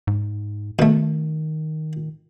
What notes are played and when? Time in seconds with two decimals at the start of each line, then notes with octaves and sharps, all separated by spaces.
0.07 G#2
0.79 B2 D#3 A3